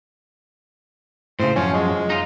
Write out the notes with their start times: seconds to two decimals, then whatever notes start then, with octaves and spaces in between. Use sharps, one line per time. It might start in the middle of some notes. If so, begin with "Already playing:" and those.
1.40 A2 C#3 C5
1.56 F#2 F3 C#4
1.74 G#3
2.10 D#4 F4